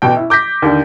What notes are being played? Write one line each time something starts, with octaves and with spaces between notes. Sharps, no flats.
A1 B2 G5
E4
D6 G6 A#6 B6
D#2 D3